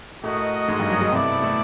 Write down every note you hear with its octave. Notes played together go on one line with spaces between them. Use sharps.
A2 A3 F#4 A#4 D#5
G#2 G#3
G2 G3
F#3
F#3
C3 B3 C4 E4 A4 D5
A2 A3